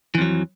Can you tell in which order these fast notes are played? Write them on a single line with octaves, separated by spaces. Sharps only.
E3 F2 F#3